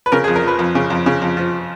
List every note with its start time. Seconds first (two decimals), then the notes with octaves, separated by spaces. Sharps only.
0.06 B4
0.12 C#3 A#4
0.24 G#4
0.28 F2
0.36 A#4
0.43 F3 B4
0.59 F2
0.75 C#3
0.90 F2
1.06 C#3
1.22 F2
1.37 F3